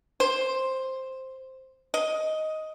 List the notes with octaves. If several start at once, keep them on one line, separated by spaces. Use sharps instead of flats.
C5
D#5